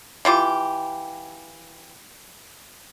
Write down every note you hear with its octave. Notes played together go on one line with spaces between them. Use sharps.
E3 F4 G4